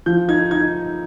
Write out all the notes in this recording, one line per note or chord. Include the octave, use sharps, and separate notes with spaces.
F3 G6
D#4 G#6
D#4 G#6